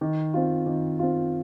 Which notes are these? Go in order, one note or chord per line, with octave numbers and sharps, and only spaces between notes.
D#3
C4 F4
D#3
C4 F4